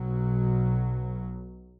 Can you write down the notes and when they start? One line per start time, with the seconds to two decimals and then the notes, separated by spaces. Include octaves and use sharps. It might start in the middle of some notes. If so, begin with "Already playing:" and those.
Already playing: B1 B2 F#3